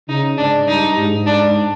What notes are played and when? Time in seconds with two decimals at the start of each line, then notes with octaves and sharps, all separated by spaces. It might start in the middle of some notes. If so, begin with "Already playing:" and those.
0.08 C#3 D#4
0.38 G#2 D4
0.68 G2 D#4
0.97 G#2
1.27 D4